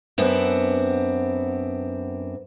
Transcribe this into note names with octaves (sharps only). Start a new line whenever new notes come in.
F#2 B3 C4 D4